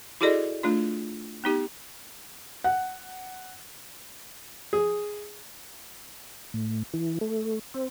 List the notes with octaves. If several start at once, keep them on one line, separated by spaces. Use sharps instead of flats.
E4 F#4 G#4 A4 D5 D#5
A3 D4 F4
B3 D#4 G4
F#5
G#4
A2
E3
A3
C4